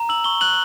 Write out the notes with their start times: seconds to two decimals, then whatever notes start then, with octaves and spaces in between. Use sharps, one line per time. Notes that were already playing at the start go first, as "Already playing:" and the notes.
Already playing: A#5
0.09 E6 F#7
0.24 C#6 G7
0.41 F#6 F#7